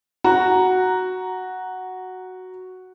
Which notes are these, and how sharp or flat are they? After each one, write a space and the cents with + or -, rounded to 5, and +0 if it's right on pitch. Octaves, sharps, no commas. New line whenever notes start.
F#4 +0 A#5 +0